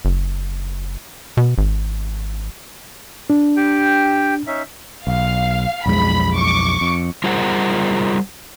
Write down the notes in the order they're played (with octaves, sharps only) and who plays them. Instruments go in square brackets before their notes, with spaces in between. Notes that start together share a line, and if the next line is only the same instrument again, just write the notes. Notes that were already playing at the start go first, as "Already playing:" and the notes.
[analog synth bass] F#1
B2
G#1
[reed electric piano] D4
[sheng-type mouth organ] G4 G5
C#4 D#4 E5
[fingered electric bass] B1 [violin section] F5
[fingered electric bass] B1 F2 G#3 [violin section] B5
[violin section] C#6 D6
[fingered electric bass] F2
[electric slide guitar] G3 F4 G#4 A#4 C5 F#5